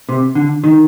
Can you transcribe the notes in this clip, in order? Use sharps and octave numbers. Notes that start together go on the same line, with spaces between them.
C3
D3
D#3